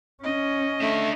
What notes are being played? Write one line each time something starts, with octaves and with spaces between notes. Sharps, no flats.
C#4 D#5
A3 D4 E5